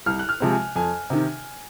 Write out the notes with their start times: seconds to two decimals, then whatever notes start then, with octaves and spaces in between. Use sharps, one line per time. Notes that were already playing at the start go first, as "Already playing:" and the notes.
0.06 C2 F6
0.19 F#6
0.29 F6
0.40 C3 F3 G#3 C4
0.52 G#5
0.76 F2 G#5
1.10 C3 D#3